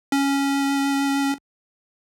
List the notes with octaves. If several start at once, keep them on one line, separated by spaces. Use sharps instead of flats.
C#4